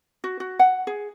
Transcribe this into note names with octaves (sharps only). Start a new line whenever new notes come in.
F#4
F#4
F#5
G#4